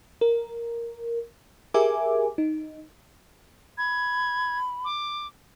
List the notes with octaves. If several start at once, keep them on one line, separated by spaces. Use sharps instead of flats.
A#4
G4 G#4 A#4 E5 G#5 D6
D#4
B5 G#6
D6